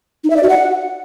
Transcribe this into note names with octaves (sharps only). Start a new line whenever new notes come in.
D#4
E5
D5
F#4
F#5